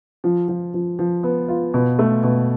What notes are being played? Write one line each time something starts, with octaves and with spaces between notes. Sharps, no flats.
F3
F3
F3
F3
B3
F4
B2
A3
B2